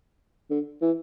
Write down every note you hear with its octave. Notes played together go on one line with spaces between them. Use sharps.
D3
E3